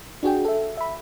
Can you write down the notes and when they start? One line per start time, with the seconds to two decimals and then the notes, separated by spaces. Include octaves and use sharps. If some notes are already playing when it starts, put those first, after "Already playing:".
0.23 D4 F#4 G#4 G5
0.45 A4 E5
0.77 E5 B5